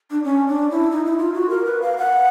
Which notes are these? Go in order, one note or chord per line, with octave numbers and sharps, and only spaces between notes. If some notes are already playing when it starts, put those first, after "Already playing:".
D4
C#4
D4
E4
D#4
E4
F4
F#4
A#4
B4
F5
F#5